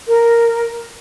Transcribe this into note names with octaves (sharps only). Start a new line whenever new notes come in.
A#4